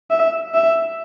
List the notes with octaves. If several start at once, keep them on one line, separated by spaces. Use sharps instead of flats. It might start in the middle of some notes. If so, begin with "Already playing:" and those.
E5
E5